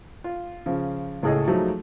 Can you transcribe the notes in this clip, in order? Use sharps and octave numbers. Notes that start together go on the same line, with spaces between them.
F4
C#3 F3
C#2 A2 G#4 A4 D#5
F3 F#3 G#3 A3 D#4